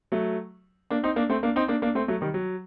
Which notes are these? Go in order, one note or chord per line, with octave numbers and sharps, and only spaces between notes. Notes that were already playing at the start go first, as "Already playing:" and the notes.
F#3 A3
A#3 D4
C4 D#4
A#3 D4
A3 C4
A#3 D4
C4 D#4
A#3 D4
A#3 D4
A3 C4
F#3 A3
D#3 G3
F#3